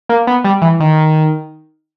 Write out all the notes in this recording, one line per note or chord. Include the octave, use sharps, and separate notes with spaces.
A#3
B3
G3
E3
D#3